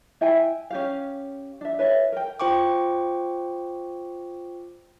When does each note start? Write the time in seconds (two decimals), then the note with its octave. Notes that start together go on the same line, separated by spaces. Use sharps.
0.21 E4 E5 G5 G#5
0.70 C#4 G4 F5
1.61 D4 E5
1.79 B4 C#5 E5
2.12 A#4 G5
2.40 F4 C5 G5 C#6 D6